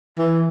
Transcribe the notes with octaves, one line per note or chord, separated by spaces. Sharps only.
E3